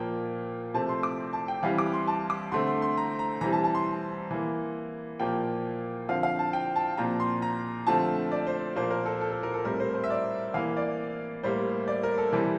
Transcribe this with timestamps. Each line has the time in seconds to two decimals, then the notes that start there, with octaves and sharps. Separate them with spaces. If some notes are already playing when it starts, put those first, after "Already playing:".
Already playing: A#2 F3 A#3 G5
0.74 C3 F3 A3 C4 A5
0.89 C6
1.03 D6
1.33 A5
1.48 G5
1.63 E3 G3 C4 F5
1.78 D6
1.93 C6
2.07 A5
2.30 D6
2.52 D3 A3 C4 C6
2.67 C6
2.82 C6
2.97 A#5
3.19 A#5
3.41 E3 G3 C4 A#5
3.53 A5
3.64 A5
3.75 C6
4.31 E3 A#3
5.19 A#2 F3 A#3 G5
6.09 D3 F3 C4 F5
6.23 F5
6.39 A5
6.53 G5
6.76 A5
6.97 A#2 F3 C4 A#5
7.20 C6
7.42 A#5
7.87 D3 F3 A3 C4 A5
8.32 D5
8.47 C5
8.76 A#2 F3 A#3 C5
8.91 A#4
9.06 A4
9.21 A4
9.31 A4
9.43 A#4
9.54 A4
9.65 A2 G3 C4 A#4
9.80 C5
9.95 C5
10.04 E5
10.10 D5
10.54 E3 A#3 F5
10.77 D5
11.43 A2 G3 A#3 C5
11.88 D5
12.03 A#4
12.18 A4
12.32 C3 E3 G3 C4 A4